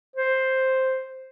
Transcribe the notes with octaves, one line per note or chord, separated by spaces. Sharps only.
C5